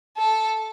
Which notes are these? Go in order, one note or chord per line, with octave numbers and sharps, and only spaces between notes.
A4